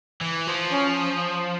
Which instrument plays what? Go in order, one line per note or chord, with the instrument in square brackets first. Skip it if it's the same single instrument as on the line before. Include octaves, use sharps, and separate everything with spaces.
[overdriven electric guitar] E3
F3
[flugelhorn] C#4